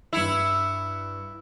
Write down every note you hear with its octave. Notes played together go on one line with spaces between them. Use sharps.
G2 E4 C#7 F7